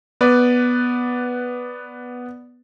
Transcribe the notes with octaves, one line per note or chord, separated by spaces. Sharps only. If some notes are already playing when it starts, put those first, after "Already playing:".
B3 B4 D5